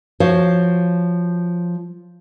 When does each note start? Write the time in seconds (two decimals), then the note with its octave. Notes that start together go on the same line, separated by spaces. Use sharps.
0.20 F3 F#4 C5 C#5